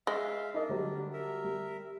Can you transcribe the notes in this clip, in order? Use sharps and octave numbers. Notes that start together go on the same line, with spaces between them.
G#3 E5 F5
D4 D#4 A#4 D#5
D3 F#3 G3
A#4 E5
G3